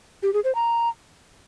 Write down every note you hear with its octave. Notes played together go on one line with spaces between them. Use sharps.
G4
G#4
C5
A#5